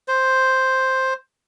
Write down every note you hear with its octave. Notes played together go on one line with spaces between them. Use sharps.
C5